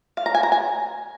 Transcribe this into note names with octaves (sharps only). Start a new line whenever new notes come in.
F5
A#5
G#5
A#5
G#5